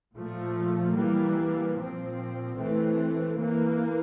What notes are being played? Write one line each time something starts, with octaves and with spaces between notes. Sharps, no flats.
A#2 F3 A3
E3 G3 A#3
A#2 F3 C4
E3 A3 C4
E3 A#3